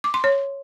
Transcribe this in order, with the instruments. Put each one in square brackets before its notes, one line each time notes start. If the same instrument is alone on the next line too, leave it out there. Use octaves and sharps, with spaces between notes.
[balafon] D6
C6
C#5